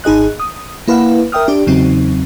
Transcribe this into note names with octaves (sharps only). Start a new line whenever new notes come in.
G#1 D#4 G#4 D#5 F#6
D#6
A#3 E4 B4 F5 F#5
A#4 E5 G5 D#6 F6
D4 G4 D5
E2 C#3 F#3 C4 D#4